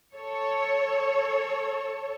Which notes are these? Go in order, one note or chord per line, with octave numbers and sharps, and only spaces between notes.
A4 C#5